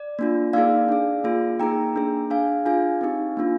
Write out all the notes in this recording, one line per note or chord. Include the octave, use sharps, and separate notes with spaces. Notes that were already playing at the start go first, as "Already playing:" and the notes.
Already playing: D5
A#3 D4 F4
A#3 D#4 G#4 D5 F5
D4 G#4
A#3 F4 G#4
A#3 D#4 G#4 G5 A#5
A#3 D4 G#4
D4 G#4 F5 G#5
D4 F4 G#4 F5 G#5
C4 D#4 G4
A#3 D4 F4